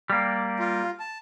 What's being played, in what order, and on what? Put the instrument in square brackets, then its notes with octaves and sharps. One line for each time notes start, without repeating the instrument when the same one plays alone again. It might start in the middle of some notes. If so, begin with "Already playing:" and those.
[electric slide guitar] G3 A#3
[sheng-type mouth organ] F4
A5